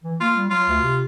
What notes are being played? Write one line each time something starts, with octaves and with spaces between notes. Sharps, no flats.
E3
A#3 F4
G3
F#3 F4
D2
C3